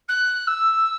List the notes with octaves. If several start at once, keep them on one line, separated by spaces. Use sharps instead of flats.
F#6
E6